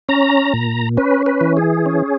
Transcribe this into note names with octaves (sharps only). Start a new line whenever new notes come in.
C#4 A#5
A#2
C#4 B4
B4
E3
G#4
C#4